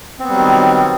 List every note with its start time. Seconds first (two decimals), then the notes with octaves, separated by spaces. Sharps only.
0.20 C4
0.24 B3
0.29 G3
0.33 F#3
0.38 D#3